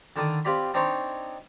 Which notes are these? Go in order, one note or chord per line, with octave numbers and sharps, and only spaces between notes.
D3 D#3 D4 D#6
C4 F4 G4 D5 B5
C4 D4 D#4 C5 C#5